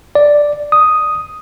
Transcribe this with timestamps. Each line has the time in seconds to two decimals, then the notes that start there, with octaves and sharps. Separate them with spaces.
0.15 D5
0.72 D#6